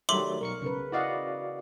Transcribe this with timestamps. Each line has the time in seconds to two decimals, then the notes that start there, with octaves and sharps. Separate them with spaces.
0.09 D#3 F#3 G3 A3 E5 C6 D6 F#7
0.41 B1 A#4 C#6 C#7
0.62 C#3 A#4 B4
0.92 E4 F#4 D5 D#5 F5 F#5